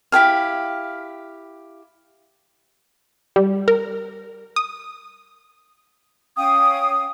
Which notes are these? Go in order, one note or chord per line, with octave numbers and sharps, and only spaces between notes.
E4 G4 G#4 F5
G3
A#4
D#6
C#4 F5 G5 D#6